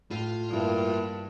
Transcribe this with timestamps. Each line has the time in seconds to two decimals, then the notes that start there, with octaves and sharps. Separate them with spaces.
0.11 A2 F4
0.51 G2 A#3 E4